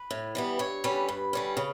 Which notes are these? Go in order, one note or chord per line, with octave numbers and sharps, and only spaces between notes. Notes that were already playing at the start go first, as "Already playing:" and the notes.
Already playing: B4
A2
E3 G3 B3
G2 C#5
D3 G3 C#4 B4
G2
D3 G3 C#4
C#3